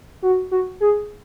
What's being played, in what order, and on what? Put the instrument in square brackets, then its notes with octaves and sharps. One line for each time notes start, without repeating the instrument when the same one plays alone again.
[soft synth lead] F#4
F#4
G#4